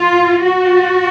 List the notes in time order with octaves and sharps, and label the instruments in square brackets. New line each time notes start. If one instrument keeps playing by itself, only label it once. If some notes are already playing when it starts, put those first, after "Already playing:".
Already playing: [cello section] F4
F#4